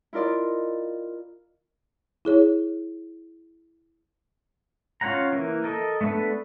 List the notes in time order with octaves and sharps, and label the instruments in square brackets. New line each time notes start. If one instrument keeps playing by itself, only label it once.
[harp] E4 F4 A#4 D5 D#5
[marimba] E4 G#4 C#5
[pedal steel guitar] C#4 F4 C#5 F#5 A#5
E3 A#3 A#4
A4 A#4 D#5
A3 B3 D4 A4 B4